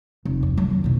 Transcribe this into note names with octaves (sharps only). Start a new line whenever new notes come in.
F1
F2
F#3 A3
D#2
F1 B2